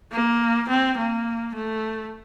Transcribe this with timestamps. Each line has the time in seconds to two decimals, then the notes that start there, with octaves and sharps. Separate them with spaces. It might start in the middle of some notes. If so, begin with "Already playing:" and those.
0.12 A#3
0.69 C4
0.98 A#3
1.55 A3